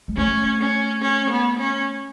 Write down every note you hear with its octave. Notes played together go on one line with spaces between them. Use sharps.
G#3
A3 C#4
C#4
C#4
B3
C#4